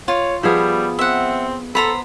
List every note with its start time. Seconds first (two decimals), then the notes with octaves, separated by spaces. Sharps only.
0.08 F4 C#5
0.43 F3 G3 B3 G#4
0.99 C4 E5 F#5
1.75 B3 A4 C5 A#5 B5